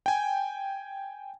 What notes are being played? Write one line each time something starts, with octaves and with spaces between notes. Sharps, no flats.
G5 G#5